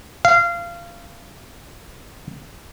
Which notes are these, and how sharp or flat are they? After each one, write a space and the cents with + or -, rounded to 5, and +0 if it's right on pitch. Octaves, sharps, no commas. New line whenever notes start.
F5 -25